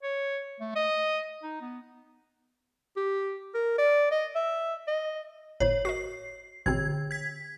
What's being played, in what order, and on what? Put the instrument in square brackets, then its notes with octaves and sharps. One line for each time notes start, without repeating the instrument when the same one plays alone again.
[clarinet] C#5
A3
D#5
D#4
B3
G4
A#4
D5
D#5
E5
D#5
[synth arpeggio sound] G1 A2 C5 [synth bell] C#5
[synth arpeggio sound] F#4 A#4 D#5 [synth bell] C7
[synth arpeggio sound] A1 B2 C4 [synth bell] D3 G#6
[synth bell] G#6 B6